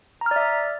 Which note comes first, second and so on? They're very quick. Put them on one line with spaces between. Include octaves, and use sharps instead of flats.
A#5 F6 D5 E5